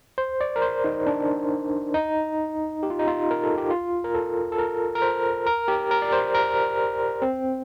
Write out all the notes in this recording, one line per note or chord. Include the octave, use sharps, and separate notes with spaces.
C5
D5
A#4
C5
D#4
D4
D#4
G4
F4
D#4
F4
A#4
A4
G4
F4
A#4
A4
A4
A#4
A#4
C5
A#4
G4
A#4
D5
C5
A#4
C4